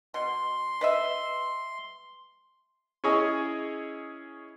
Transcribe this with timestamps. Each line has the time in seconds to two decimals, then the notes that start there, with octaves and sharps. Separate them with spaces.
0.14 B2 C6
0.81 B4 D#5 E5
3.04 C#4 E4 G#4 C#5 D#5